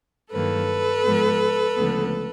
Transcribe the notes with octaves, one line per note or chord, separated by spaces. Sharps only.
G2 D#3 F#3 A#3 A4 B4
G#2 F3 G#3 B3
D2 C#3 F3 G#3 B3